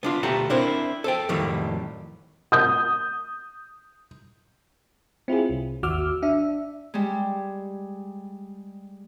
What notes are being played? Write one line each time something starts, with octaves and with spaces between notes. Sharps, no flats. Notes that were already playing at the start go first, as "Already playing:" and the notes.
B3 D4 F4
D2 B2 G4 A4 F#5 A#5
C4 D4 E4 A#4 C5
A4 C5 G5
F2 A2 D#3 F#3 G3 A#3
D#6 G6
C4 E4 F4 G#4
C2
G#1 D#2 F#4 D6 E6 F6
D4 E5
G3 G#3